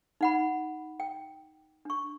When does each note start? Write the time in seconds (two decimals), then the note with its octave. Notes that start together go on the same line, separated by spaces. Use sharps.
0.21 D#4 F#5 B5
1.00 G5
1.85 D4 C#6